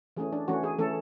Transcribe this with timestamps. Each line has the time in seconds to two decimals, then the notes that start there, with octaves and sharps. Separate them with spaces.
0.17 E3 A3 C#4 G#4
0.33 D4
0.48 E3 A3 C#4 F#4
0.63 G#4
0.79 E3 A3 C#4 A4